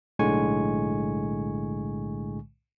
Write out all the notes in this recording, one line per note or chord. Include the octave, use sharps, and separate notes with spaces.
B1 A2 D3 G#3 G#5 C#6